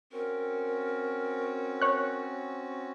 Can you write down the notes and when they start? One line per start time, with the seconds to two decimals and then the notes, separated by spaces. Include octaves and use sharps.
0.13 C4 C#4 F#4 A#4
1.82 C#5 F#6